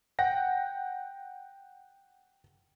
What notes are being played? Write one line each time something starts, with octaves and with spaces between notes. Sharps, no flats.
F#5 G5 A#6